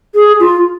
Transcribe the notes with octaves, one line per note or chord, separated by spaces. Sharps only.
G#4
F4